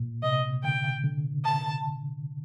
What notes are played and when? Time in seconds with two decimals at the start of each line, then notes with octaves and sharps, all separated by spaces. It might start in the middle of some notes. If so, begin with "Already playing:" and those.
Already playing: A#2
0.23 C3 D#5
0.63 D3 G5
1.04 D3
1.45 A5